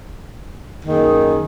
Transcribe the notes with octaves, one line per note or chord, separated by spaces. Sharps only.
F#2 D#3 A#3 D#4 G#4